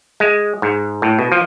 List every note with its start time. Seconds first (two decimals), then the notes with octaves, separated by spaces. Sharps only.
0.20 G#3
0.62 G#2
1.02 A2
1.19 B2
1.32 F3